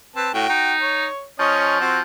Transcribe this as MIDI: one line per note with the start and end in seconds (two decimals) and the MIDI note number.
0.16 0.30 60
0.16 0.30 71
0.16 0.30 81
0.34 0.47 45
0.34 0.74 66
0.34 0.74 79
0.50 1.05 63
0.80 1.26 73
1.40 2.02 53
1.40 1.79 61
1.40 1.79 73
1.40 1.79 75
1.81 2.00 60
1.81 2.00 66